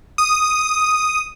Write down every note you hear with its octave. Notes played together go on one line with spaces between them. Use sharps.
D#6